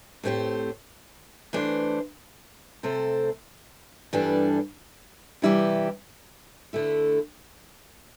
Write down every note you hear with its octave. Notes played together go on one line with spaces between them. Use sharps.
A2 A3 C4 G4 C5
E3 A3 D4 C5
C3 A3 C4 A4 C5
G2 E3 G3 D4 A4
C3 E3 G3 E4 G4
D3 A3 E4